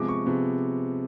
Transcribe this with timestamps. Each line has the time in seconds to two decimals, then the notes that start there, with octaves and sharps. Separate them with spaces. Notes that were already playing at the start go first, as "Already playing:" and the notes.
Already playing: C3 F3 G#3 B3 D6
0.08 C#6
0.26 C3 F3 G#3 B3